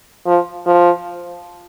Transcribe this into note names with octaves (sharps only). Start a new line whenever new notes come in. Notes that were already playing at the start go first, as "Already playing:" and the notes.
F3
F3